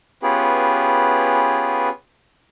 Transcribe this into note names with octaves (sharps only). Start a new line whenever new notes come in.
B3 C#4 F4 G4 G#4 B4